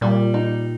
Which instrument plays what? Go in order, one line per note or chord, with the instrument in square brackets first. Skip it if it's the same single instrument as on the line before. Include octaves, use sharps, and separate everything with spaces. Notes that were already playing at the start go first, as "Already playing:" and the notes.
[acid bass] A#2 [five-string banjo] G3
[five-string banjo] D#4